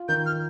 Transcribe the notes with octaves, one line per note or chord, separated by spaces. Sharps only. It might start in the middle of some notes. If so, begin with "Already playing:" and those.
Already playing: F4
D#3 G6
F6